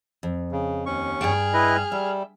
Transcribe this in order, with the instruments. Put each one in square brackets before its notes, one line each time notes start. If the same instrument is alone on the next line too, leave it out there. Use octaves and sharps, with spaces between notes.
[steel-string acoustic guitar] F2
[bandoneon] C#3
D#2 C#4 C#6
[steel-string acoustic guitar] G2 G5 [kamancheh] G#4 F6
[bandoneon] E4 B4 D#5
[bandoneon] G3 [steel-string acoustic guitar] E5